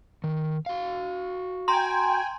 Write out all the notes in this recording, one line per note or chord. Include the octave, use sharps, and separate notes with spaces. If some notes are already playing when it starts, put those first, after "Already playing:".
D#3
F#4 F5
G5 G#5 A#5 C6